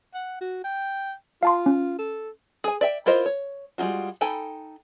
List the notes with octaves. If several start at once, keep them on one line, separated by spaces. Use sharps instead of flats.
F#5
F#4
G5
F4 F5 A5 C6
C#4
A4
G#4 G#5
D5 E5 G5
E4 F4 A#4 C5 D#5
C#5
G3 G#3 D#4 F4 F#4
D#4 A4 G5 G#5 B5